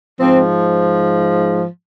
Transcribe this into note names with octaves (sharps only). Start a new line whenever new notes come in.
G#2 F3 C4